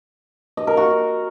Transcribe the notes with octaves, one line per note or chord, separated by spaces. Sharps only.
D#5
A#4
F#4